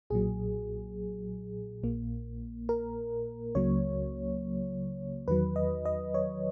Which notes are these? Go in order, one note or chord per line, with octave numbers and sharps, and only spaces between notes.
B1 A#2 F#3 G#4
A#1 A#2 A#3
A#4
C#2 C#3 F#3 A#3 C#5
E2 D#3 F#3 B4
D#5
D#5
C#5